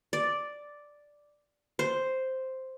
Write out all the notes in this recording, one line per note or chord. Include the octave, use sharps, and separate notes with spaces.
D5
C5